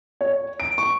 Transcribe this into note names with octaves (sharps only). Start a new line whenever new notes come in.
C#5
D7
C#6